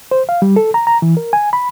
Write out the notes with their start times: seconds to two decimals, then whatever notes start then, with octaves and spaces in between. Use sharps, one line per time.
0.11 C5
0.29 F5
0.42 G3
0.56 A4
0.74 A#5
0.87 A#5
1.02 E3
1.17 A#4
1.33 G#5
1.53 B5